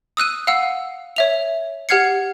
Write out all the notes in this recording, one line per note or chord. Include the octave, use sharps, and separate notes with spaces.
D#6 E6 F#6 D#7
F5 F#5 E6
C#5 E5 F7
G4 F#5 F6 G#6 C7 C#7